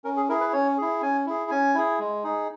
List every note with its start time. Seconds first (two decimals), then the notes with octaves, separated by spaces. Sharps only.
0.04 C#4 A#4
0.17 G#4
0.29 E4 G#4 A#4
0.41 B4
0.53 C#4 C#5
0.78 E4 G#4
1.02 C#4 G#5
1.26 E4 G#4
1.50 C#4 G#5
1.75 E4 G#4
1.99 G#3
2.24 D#4 G#4